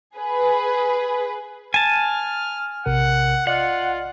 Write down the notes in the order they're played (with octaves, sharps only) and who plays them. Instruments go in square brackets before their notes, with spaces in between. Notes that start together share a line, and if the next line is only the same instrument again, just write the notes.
[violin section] G#4 B4
[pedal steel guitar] G#5 A5 [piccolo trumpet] F6
[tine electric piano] A#1 C3 A#4 [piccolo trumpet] F#5
[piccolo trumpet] F4 [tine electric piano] D5 D#5 [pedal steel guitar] F#5